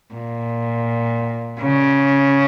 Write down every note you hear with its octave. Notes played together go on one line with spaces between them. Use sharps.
A#2
C#3